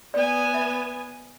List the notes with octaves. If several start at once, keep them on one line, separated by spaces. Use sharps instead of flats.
B3 D5 G#5
E5